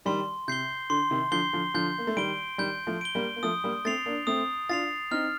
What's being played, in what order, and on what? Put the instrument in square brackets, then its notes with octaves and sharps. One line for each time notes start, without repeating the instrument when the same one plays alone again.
[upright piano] D#3 G3 [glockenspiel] C6
[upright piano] C3 [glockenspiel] G6 C7 G7
[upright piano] D3 [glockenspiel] C6
[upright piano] C3 D#3
[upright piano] D3 F3 [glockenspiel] G6 C7 G7
[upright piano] D3 F3
[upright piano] D3 F3 [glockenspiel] G6
[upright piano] A#3
A3
[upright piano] D#3 G3 [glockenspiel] D7 G7
[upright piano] D#3 G3 [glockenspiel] G6
[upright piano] F3 A3
[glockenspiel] D7 G7
[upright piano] G3 A#3
A#3
[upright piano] F3 A3 [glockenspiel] D#6
[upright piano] G3 A#3
[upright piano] A3 C4 [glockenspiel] A6 C7 F7
[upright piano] A#3 D4
[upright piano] A3 C4 [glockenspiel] D#6
[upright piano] D4 F4 [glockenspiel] A6 C7 F7
[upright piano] C4 D#4 [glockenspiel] F6